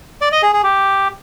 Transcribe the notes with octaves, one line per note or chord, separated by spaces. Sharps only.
D5
D#5
G#4
G#4
G4